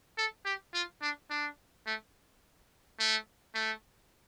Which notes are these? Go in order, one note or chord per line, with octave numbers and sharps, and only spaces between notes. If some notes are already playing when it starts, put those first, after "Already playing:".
A4
G4
F4
D4
D4
A3
A3
A3